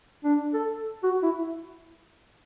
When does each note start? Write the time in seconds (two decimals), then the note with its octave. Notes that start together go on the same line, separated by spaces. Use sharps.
0.24 D4
0.53 A4
1.03 F#4
1.23 E4